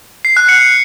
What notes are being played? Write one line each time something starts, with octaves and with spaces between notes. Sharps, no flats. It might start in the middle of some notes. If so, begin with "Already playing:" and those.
C7
F#6
C#7